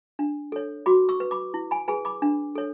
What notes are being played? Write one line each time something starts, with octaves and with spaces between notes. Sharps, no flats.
D4
A4 C#5
F#4 B5 D6
C#6 E6
B4
B5 D6
E4
G#5 B5
G#4 B4 G#5 B5
B5 D6
D4
A4 C#5